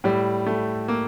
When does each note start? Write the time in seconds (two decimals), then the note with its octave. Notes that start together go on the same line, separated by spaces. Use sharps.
0.04 A2 G3
0.47 A3
0.88 A#3